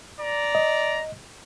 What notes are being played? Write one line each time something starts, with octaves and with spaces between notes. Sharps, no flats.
D5 A#5
D#5